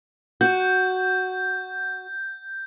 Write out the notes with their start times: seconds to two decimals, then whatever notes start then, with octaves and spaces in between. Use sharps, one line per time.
0.41 F#4 G6